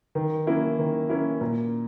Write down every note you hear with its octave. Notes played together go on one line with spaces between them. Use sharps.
D#3
A#3 C#4 E4
D#3
A#3 C#4 E4
A#2